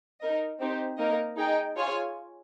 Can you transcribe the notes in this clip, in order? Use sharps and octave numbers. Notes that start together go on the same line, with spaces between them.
D#4 A#4 D#5
C4 D#4 G4 C5
A#3 D#4 A#4 D#5
D#4 G#4 D#5 G5
F4 G#4 C#5 G#5